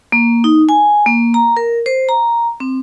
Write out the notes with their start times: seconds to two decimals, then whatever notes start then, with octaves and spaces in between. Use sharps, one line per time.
0.12 A#3
0.44 D#4
0.69 G#5
1.06 A#3
1.34 A#5
1.57 A#4
1.86 C5
2.09 A#5
2.60 C4